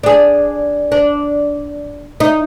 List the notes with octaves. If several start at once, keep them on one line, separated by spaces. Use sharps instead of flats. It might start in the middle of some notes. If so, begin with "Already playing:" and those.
D4 G#4
D4
D#4